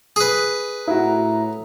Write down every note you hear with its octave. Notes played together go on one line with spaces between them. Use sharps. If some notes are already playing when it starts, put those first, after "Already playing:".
G#4 B4
A2 E4 F#4 A#5